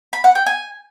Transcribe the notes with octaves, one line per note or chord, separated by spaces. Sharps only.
B5
F#5
G5
G#5